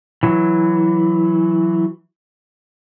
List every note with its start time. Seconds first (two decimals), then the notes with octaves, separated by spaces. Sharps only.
0.23 E3 F#3